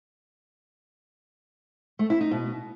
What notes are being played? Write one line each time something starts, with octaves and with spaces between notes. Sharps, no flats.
A3
E4
D#4
B2